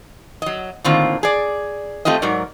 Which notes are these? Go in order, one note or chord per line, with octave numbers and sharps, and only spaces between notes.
F#3 D#5
A2 D3 D#3 A#3 C4 F4
G#4 D5
A3 C4 F4 G4 D#5
G#2 F#3 F#4 A#4 D5